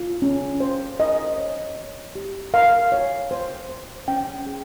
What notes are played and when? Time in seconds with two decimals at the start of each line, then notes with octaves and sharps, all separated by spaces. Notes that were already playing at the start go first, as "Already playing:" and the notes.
Already playing: F4
0.22 C#4
0.60 C5
1.00 A#4 D#5
1.38 C#5
1.76 C#5
2.15 G4
2.54 A#4 F5
2.92 C#5
3.31 C5
3.69 C5
4.08 C#4 G5
4.46 G#4